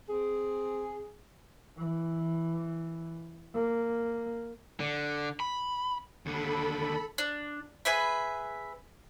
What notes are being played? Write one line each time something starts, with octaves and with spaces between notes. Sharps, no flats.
C4 G#4
E3
A#3
D3
B5
D#2 D3 A4 B5
D4
G#4 B4 E5